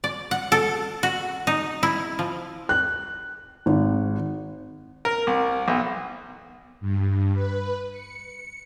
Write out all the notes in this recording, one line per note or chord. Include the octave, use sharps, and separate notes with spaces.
D5
F#5
A4
F#4
D#4
E4
F3
F#6
G#1
A#4
C2
B1
G2
B4
C#7